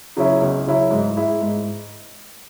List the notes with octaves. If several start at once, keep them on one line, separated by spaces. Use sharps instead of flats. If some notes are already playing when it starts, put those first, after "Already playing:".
C#3 F#3 C#4 E4
C#2
C#3 F#3 C#4 E4
G#2
G#3 E4
G#2